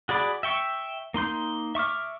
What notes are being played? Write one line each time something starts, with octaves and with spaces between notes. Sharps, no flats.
F#4 G#4 D5 B5 D6
E5 G5 C#6
A#3 D#4 C6 G6
E5 C#6 D6 F6